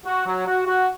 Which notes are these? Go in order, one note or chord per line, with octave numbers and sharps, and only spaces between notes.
F#4
F#3
F#4
F#4